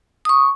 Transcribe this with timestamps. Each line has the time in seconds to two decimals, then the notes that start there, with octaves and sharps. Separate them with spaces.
0.25 D#6
0.29 C#6